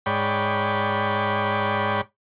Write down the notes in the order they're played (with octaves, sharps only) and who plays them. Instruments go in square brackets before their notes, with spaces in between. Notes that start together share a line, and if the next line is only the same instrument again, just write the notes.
[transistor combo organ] G#2 C#5 D5 G5 B5